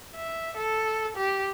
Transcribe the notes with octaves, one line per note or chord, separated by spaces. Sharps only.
E5
A4
G4